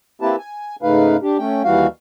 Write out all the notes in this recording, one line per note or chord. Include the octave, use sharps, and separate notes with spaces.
A#3 C4 E4 G4 B4 A5
G#5
G#2 C#3 A3 D#4 B4 F5
D4 G4
A3 C#4 G5
D#2 E3 G3 F#4 F5